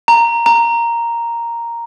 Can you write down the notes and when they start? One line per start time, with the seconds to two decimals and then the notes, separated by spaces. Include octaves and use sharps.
0.08 A#5
0.46 A#5